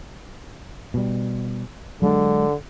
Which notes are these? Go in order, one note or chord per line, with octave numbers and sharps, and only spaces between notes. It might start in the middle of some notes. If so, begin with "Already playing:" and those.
B2 G3
D3 F#3 G#3 D4